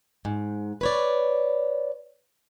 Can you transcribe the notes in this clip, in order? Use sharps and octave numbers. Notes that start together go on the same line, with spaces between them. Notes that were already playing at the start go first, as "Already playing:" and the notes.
G#2
B4 C#5 D5